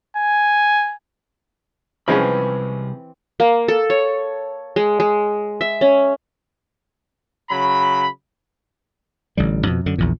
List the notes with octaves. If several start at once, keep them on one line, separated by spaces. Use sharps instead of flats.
G#5
C2 E3 F3 G#3 C4 C#4 B5
A#3
A4
C#5
G#3
G#3
E5
C#4
C#3 F#3 B5
A1 D3 G3
F2 B2
F#2 D3
A#1 E2 A#2